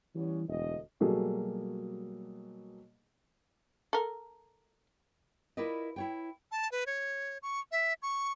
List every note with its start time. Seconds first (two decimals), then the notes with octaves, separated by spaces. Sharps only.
0.15 E3 G3 B3 C#4
0.49 E1 D2 A3 D#5
1.00 B2 F#3 G3 A#3 G#4 A4
3.93 A4 A#4
5.57 E4 F4 A#4 B4 D5 D#5
5.96 E4 C#5 G5
6.52 A5
6.72 B4
6.86 C#5
7.43 C#6
7.72 E5
8.02 C#6